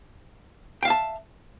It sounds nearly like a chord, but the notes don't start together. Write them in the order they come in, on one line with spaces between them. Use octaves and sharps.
G5 F5 E5 A5